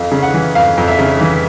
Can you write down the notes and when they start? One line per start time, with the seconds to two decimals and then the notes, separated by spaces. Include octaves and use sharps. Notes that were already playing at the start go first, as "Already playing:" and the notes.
Already playing: F2 F5
0.12 C#3
0.23 F#5
0.34 E3
0.55 F2 F5
0.78 F2
0.88 E5
0.99 C#3
1.21 E3